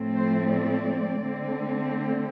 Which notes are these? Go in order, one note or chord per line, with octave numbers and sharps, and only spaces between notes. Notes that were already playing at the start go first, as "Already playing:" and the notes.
Already playing: A2 F3 A3 C4
C5
D5
D3 A3 C4